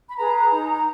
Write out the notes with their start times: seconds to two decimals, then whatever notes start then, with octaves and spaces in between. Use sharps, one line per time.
0.10 B5
0.18 G#4 B4 A#5
0.51 D#4